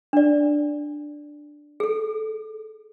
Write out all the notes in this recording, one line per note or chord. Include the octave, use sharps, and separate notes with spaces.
D4 D5
G#4 A4